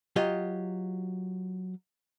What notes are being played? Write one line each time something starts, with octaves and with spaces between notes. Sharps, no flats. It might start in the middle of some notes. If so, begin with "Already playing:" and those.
F#3 F4 G4 D#5